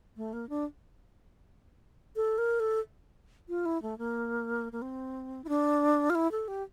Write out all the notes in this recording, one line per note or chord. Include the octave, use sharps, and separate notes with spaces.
A3
A#3
D4
A4
A#4
A4
F4
E4
A3
A#3
A#3
C4
E4
D4
F4
E4
A4
G4